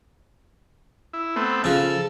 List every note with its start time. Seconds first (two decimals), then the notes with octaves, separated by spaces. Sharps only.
1.13 E4
1.36 A3 B3 C4
1.64 C#3 F3 A4